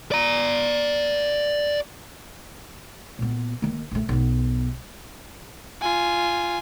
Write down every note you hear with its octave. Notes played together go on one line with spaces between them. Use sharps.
D5 A#5
A#2 B3
D#3 A#3
A#1 A3
B1 B3
F4 G#5